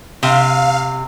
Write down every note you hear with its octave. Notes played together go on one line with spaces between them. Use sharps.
C3 F5